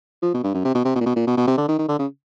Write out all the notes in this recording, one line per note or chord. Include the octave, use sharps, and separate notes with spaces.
F3
B2
G2
F#2
C3
B2
C3
B2
A#2
B2
A#2
B2
B2
C3
D3
D#3
D#3
D3
C#3